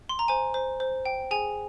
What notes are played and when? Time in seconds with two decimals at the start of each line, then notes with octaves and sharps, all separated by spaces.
0.09 C6
0.19 A#5
0.28 C5 G#5
0.54 C5
0.80 C5
1.05 G5
1.31 G#4 G#5